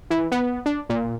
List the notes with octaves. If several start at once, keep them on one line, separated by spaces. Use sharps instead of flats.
E3
B3
D4
A#2